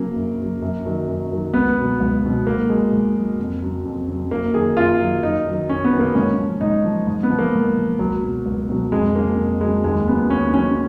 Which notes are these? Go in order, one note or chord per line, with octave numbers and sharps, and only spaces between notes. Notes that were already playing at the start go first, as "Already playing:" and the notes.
Already playing: C#3 F#3 A#3
F#2
C#3 F#3
F#2
D#3 F#3
F#2
D#3 F#3
C#2 B3
B2 F#3
C#2
B2 F#3
G#2 A#3
F#3 G#3
G#2
F#3
F2
C#3 F#3
F2
C#3 F#3
F#2 A#3
D#3 F#3 G#4
F#2 F4
D#3 F#3
F#2 D#4
D#3 F#3
F#2 C#4
B3
D#3 F#3
A#3
G#2 C#4
F3
G#2 D#4
F3
G#2
B3
F3
A#3
G#2
F3
C#2 F#3
B2 F#3
C#2
B2 F#3
F2 G#3
C#3 F#3 A#3
F2
C#3 F#3 G#3
D#2 G#3
C#3 F#3 B3
D#2 C#4
C#3 F#3 C#4